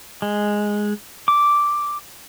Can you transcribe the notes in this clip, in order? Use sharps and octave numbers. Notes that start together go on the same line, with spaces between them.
G#3
D6